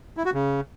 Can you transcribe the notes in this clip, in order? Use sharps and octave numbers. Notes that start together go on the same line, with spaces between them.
E4
F#4
C#3